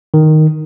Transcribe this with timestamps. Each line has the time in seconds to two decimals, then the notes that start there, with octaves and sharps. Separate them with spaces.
0.14 D#3